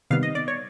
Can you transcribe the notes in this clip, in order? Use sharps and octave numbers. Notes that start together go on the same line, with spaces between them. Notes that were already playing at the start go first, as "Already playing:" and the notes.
C3 D#3 G3 B3 F5
D#5
D5
C#5